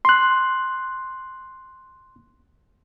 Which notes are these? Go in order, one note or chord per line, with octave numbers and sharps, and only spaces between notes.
C6 F#6